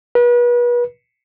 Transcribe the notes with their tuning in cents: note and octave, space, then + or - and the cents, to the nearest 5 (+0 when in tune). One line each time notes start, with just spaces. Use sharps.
B4 -35